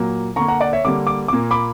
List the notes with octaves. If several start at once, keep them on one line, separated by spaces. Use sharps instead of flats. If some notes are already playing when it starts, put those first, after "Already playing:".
Already playing: A#2 F#3 A#3
D3 A#3 A#5 C#6
F#5 A#5
D5 F#5
C#5 E5
D3 G3 A#3 D6
D6
A#2 A#3 D6
B5 D6